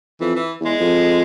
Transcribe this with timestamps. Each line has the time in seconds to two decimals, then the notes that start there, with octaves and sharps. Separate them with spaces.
0.20 F2 E3
0.36 E3
0.60 E2 G#3
0.80 F2